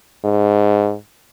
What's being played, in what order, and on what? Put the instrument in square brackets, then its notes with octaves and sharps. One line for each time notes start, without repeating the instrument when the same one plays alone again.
[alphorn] G#2